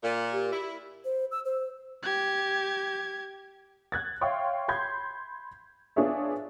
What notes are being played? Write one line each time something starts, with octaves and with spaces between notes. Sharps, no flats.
A#2
G4
E4
C5
E6
C5
G4 G#6
F#6 G#6 A6
C#5 E5 F5 G5 C6 C#6
B5 C6 G6 G#6
B3 D4 F4 G#4 C#5 E5